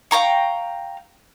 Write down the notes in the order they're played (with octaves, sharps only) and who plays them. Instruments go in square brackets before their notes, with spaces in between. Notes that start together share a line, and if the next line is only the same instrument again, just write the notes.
[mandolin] F5 G5 A#5 C#6